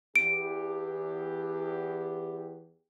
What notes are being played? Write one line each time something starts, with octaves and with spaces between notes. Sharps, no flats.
E2 G4 D7